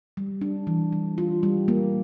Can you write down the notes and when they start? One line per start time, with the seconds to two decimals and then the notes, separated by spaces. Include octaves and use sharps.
0.17 G3
0.41 D4
0.67 E3
0.93 G3
1.18 F4
1.43 G3
1.68 A#3